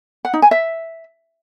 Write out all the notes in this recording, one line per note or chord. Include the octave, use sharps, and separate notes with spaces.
F#5
D#4
G#5
E5